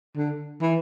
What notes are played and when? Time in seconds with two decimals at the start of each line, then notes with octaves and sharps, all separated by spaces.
0.16 D3
0.61 E3